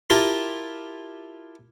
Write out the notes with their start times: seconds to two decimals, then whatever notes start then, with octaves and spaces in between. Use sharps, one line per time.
0.10 E4 F4 G4 A#4 G5 A5